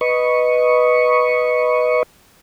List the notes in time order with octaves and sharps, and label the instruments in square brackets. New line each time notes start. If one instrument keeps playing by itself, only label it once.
[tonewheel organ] B4 D#5 C#6